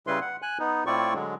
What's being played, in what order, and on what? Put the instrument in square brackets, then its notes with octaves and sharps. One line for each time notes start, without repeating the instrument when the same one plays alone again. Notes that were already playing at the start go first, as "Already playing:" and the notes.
[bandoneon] C#3 G3 E4 B4 C6
F#5
G#5 F#6
B3 D#4
A2 C4 E4 F4 D5 C#6
D3 F#3 G#3